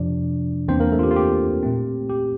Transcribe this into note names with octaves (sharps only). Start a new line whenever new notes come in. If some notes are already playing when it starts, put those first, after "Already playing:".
Already playing: F2 C3 F3 D4 D5
E2 E3 A#3 C4 D4 C5
A#3 A#4
A3 A4
F4
G4
F4
G4
A#2 A3 C4
G4